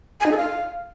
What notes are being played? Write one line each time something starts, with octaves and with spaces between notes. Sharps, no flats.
G#5
D#4
A4
F5